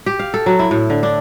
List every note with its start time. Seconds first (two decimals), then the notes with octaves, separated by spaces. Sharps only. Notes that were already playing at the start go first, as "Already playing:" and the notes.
0.06 G4
0.19 F5
0.34 A4
0.46 F#3
0.59 E4
0.71 A2
0.90 D3
1.03 D4